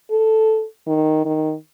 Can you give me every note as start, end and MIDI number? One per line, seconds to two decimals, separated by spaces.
0.10 0.65 69
0.87 1.24 51
1.25 1.54 51